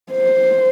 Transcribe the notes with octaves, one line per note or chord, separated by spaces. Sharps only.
C5